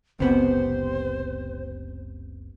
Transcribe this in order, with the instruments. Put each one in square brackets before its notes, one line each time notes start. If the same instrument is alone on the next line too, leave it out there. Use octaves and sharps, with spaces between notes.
[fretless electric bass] F#1 C#2 [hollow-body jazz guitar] C3 B3 [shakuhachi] C5